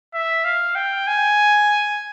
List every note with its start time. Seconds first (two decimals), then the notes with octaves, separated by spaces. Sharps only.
0.14 E5
0.45 F5
0.76 G5
1.08 G#5